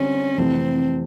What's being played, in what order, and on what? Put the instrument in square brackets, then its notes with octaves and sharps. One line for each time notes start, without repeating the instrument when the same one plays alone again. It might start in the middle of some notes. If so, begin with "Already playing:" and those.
Already playing: [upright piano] D3 G3 C4 [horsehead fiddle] C#4
[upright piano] F2 C3 E3 A3 [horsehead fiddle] C4